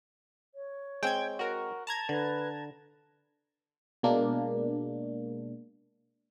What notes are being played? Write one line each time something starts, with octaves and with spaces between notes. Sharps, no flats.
C#5
G#3 C4 G5 G#6
F#4 A#4
A5 A#5 G#6
D3 B4
B2 G#3 A#3 D4